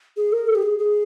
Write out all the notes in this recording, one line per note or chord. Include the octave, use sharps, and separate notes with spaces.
G#4
A#4
A4
G4
G#4
G#4